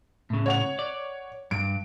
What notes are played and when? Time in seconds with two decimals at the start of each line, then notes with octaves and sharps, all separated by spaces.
0.30 A2 C#3
0.46 C#5 F#5 F7
0.79 D5
1.51 G2 D7